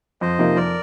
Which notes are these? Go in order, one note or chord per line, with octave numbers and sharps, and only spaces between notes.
F2 C5 D#5
C3 F3 A#3 D#4
F2 A#4 D5